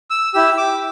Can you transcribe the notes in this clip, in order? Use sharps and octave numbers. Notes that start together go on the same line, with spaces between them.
E6
E4 G4 E6
D6